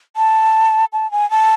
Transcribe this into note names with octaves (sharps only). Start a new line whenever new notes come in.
A5
A5
G#5
A5